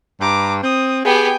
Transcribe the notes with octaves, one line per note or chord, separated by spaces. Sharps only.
G2 A#5 D6
C4 D#6
B3 G4 G#4 G5 G#5